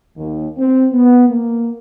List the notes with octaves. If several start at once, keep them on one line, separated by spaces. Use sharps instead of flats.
D#2
C4
B3
A#3